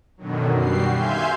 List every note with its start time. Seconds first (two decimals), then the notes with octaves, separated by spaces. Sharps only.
0.17 F#2 B2 D3 D#3 F#3
0.56 G3 F#4 G4 C7
0.90 E5 F5 G#5 C6 G6